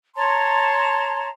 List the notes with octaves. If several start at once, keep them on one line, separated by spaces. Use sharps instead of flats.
C#5 A5 A#5 C6